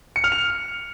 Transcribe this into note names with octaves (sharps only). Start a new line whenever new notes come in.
C#7
F6
F7